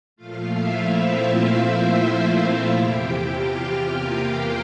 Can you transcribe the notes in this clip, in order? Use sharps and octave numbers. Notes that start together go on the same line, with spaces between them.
A#2 F3 A3 F4 F5
E4 E5
C4 C5
E4 E5
F4 F5
E2 C3 E3 G4 G5
G4 G5
F4 F5
G4 G5
A#3 A#4